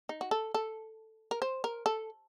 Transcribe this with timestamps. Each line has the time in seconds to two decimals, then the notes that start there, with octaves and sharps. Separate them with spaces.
0.09 D#4
0.21 F#4
0.31 A4
0.54 A4
1.31 A#4
1.42 C5
1.64 A#4
1.86 A4